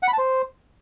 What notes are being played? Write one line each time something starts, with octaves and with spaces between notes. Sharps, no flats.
F#5
B5
A5
C5